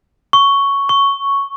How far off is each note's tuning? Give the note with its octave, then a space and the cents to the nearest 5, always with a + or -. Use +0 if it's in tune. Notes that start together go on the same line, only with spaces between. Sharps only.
C#6 +5
C#6 +0